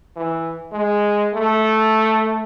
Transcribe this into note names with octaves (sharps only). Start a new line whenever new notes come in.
E3
G#3
A3